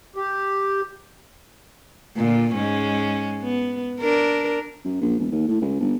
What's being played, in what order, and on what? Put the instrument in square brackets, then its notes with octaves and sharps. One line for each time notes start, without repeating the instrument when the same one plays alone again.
[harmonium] G4
[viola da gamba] A#2 D3 F4
G#2 G#3 C#4
B3
D4 A#4
[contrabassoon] F#2
A#1
E1
D#2
A2
C#2
G1